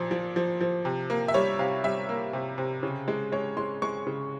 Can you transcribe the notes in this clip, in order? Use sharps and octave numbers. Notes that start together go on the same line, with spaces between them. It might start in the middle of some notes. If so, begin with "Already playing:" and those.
Already playing: A#2 F3
F3
F3
F3
C3
A#3
E5
G3 C#5
C3 F5
G3 E5
A#3
C3
C3
C#3 C#5
G#3
G#3 C#5
G#3 C6
G#3 C#6
C#3